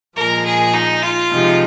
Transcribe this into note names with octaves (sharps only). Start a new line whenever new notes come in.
A#2 F3 G#3 A#4
G#4
D#4
F4
C3 F3 G#3 D#4